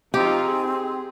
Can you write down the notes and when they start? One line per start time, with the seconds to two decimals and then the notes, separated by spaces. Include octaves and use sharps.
0.14 F3 C4 D#4 F4 G4
0.44 G#4